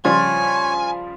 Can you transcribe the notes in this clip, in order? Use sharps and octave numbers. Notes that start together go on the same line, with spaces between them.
C#3 F3 G3 F4 C#5 G#5